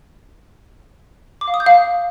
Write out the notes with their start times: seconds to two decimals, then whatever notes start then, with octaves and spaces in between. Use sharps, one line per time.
1.41 D6
1.48 F5
1.54 D#6
1.60 G6
1.66 F5